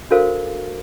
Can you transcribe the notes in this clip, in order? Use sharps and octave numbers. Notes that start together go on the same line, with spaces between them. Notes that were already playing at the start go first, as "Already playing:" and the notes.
D4 F#4 A4 A#4 C5 F5